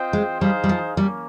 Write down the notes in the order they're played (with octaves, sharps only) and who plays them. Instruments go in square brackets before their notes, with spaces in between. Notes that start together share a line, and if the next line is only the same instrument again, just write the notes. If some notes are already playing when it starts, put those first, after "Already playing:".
Already playing: [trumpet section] C4 F4 C5 D#5 G5
[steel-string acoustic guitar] G#3
[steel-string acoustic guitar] G3 [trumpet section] D#4 G#4 C5 F5
[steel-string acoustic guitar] G3
F3
[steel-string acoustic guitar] G3 [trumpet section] A#3 C#4